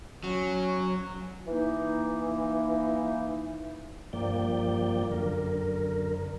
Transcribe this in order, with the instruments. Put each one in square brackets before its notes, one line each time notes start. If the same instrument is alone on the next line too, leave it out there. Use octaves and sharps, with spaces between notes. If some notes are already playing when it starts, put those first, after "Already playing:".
[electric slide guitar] F#3 [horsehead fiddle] C#4
[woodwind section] E3 A#3 D#4
[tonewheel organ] G2 F3 A#3 D5 G5
F#2 D3 A#4